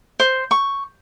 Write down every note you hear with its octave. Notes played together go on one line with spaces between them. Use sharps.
C5
C#6